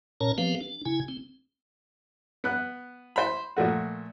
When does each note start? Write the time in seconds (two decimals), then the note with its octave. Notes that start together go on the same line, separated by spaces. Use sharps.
0.21 A#2 C#4 A#4 C#5 A5 A#5
0.38 F3 B3 C4 G4 B4 F5
0.61 D4
0.85 C#3 E4 G#5
1.08 C4
2.44 B3 F#6
3.16 C5 B5
3.56 A#2 F3 A3 F#4